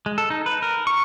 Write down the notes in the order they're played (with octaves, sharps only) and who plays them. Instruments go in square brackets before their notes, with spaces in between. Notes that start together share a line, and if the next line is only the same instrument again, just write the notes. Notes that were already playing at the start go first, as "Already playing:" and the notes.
[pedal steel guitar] G#3
A4
D#4
B4
A#4
C#6